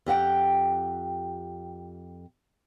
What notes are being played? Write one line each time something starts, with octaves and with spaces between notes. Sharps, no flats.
F2 G4 F#5 G5